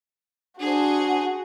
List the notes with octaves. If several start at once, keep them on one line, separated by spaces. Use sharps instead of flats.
D4 F#4 G#4 C5